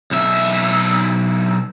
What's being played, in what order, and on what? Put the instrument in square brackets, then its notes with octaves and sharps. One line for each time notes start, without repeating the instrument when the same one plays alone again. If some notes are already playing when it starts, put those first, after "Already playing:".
[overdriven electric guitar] B1 E5